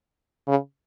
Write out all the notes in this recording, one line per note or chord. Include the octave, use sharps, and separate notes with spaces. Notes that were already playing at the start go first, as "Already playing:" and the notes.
C#3